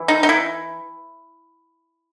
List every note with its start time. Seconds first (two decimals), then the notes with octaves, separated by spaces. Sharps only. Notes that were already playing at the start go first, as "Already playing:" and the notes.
Already playing: E3
0.08 D#4
0.23 D#4
0.29 E4